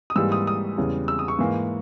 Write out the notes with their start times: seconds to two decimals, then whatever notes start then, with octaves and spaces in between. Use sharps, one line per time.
0.10 D#6
0.16 G#2 E3 G3 A#3 E6
0.32 D#6
0.47 D#6
0.77 E2 C#3 G3
1.08 E6
1.19 D#6
1.28 C#6
1.39 G#2 E3 A#3